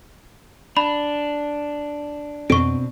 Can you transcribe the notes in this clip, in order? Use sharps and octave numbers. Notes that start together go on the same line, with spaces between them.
D4 B5
F2 B2 C4 C#6 D7